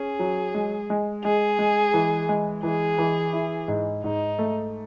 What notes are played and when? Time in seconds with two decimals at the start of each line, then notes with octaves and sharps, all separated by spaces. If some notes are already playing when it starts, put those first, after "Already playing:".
Already playing: C#4 G#4
0.19 F#3
0.55 G#3
0.90 G#3
1.24 G#3 G#4
1.59 G#3
1.94 E3
2.29 G#3
2.63 E3 G#4
2.98 E3
3.33 E4
3.68 G#2
4.03 G#2 D#4
4.39 A3